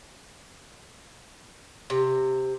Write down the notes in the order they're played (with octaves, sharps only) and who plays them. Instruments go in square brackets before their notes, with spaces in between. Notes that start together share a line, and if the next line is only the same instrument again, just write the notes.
[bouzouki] C3